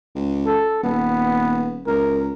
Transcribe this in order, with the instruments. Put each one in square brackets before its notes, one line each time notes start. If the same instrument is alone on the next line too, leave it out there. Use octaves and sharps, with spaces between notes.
[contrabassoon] C#2
[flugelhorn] A4
[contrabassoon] D#1 [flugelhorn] B3
[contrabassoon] C#2 [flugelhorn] A#4